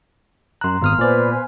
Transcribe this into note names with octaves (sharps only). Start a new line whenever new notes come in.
F#2 A#5 C6 F#6
G#1 B3 D#6 F6
A#2 B4 C5 D5 G#5